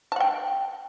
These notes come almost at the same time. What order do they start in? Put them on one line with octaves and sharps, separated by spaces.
A5 F#5 G5